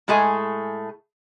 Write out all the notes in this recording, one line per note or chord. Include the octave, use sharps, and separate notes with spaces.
A2 G#3 A3 G#4 G#5